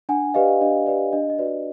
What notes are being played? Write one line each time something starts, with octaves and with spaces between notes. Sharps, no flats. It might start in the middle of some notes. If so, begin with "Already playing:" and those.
D4 F#5 G#5
G4 B4 D5 D#5 F5
D4 D#5
G4 B4 D5
D4 D#5
D#5
F#4 B4 D5
D#5